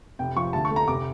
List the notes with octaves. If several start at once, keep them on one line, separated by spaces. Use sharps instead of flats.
F1 G5
F3 C#6
D2 A5
C#6
A3
A#5
F1 D6